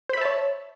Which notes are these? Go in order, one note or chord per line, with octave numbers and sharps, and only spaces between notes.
C5 C#5 E5 A5 B5